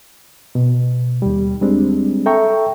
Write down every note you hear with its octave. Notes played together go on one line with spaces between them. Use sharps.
B2
D#2 G3
G3 G#3 C4 D4
A4 E5 G5 A#5 C#6